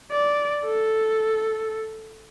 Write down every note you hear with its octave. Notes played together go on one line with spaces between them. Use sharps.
D5
A4